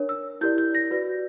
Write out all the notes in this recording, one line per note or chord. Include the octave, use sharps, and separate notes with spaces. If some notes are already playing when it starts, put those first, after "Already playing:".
Already playing: D4 A#4 C#5
E6
E4 G4 A#4 D5 G6
G6
A#6
F#4 B4 D5